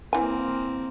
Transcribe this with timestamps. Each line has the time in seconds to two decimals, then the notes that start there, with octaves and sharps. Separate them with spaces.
0.13 E3 A#3 C4 G#5